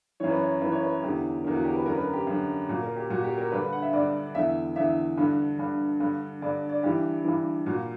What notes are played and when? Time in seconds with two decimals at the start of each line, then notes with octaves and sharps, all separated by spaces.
0.20 F#2 E3 C#5
0.30 B4
0.40 C#5
0.62 F#2 E3 B4
0.72 C#5
0.82 B4
1.03 E2 D3 G4
1.44 E2 D3 A#4
1.54 F#4
1.65 G4
1.75 B4
1.86 F#2 D3 A#4
1.94 B4
2.00 A#4
2.13 G4
2.27 F#2 D3
2.69 A#2 F#4
2.83 A#4
2.96 G4
3.10 A#2 F#4
3.24 G4
3.38 A#4
3.51 G2 D3 B4
3.62 B4
3.73 F#5
3.82 E5
3.93 G2 D3 D5
4.35 E2 D3 E5
4.76 E2 D3 E5
5.17 G2 D3
5.59 G2 D3
6.00 G2 D3
6.42 G2 D3 D5
6.69 D5
6.83 G2 E3 G4
7.25 G2 E3
7.66 A#2 F#4